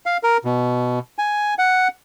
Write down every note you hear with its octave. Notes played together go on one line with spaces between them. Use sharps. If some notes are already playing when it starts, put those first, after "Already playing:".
F5
A#4
B2
G#5
F#5